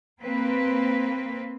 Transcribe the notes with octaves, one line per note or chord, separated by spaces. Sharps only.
A#3 C4 B4